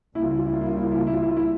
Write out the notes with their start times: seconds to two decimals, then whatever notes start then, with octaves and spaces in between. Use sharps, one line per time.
0.15 C#2 C#3 G3 A#3 E4
0.23 F4
0.31 E4
0.38 F4
0.46 E4
0.53 F4
0.61 E4
0.69 F4
0.77 E4
0.84 F4
0.92 E4
0.99 F4
1.07 E4
1.14 F4
1.22 E4
1.29 F4
1.37 E4